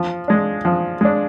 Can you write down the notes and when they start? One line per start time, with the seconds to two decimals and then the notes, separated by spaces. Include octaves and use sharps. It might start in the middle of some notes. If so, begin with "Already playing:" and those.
Already playing: F3
0.28 G#3 D4
0.65 F3
1.01 G#3 D4